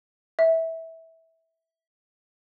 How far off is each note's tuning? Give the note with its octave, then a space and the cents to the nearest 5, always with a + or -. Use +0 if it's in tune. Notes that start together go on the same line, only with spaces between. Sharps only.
E5 -15